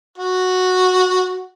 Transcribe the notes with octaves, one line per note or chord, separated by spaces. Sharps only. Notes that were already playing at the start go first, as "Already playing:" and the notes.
F#4